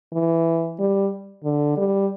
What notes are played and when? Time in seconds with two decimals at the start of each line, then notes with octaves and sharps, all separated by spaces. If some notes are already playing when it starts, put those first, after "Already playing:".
0.13 E3
0.79 G3
1.44 D3
1.77 G3